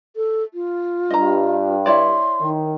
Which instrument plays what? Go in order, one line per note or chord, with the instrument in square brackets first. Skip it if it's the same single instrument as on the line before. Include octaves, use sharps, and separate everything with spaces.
[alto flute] A4
F4
[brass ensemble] G2 [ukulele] D#5 A#5
[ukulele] E4 C#5 D5 [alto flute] C6
[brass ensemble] D#3